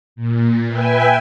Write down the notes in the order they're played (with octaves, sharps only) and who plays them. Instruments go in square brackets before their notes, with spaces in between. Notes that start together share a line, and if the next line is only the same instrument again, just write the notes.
[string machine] A#2
B4 E5 G5 G#5